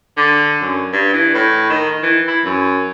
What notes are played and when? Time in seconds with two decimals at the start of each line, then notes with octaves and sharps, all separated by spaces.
0.17 D3
0.62 F#2
0.93 G2
1.14 E3
1.34 A2
1.70 D#3
2.03 E3
2.28 E4
2.44 F#2